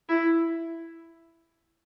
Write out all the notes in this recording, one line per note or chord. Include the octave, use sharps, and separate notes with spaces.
E4